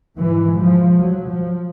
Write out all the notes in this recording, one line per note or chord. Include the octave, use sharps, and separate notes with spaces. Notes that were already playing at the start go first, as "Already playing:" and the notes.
G#2 E3
F3
F#3
F3